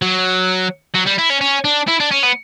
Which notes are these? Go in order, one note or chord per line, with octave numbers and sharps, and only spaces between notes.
F#3
F#3
G3
E4
C#4
C#4
D4
E4
D4
C#4
B3